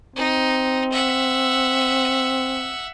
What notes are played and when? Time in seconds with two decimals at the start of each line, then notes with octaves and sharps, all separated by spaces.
0.16 C4 D#4
0.92 E5 F#5